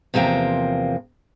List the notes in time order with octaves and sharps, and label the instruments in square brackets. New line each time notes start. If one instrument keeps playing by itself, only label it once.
[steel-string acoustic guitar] E2 C3 F3 A#3 G5